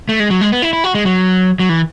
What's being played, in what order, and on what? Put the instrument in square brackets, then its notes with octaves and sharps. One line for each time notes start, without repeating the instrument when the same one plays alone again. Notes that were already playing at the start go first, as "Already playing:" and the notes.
[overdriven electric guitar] A3
G#3
F#3
G#3
B3
E4
E4
F#4
G#3
F#3
F#3
E3